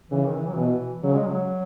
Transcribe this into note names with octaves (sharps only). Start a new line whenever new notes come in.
C#3 E3
D#3
E3
F#3
B2 E3
C#3 F#3
G#3
F#3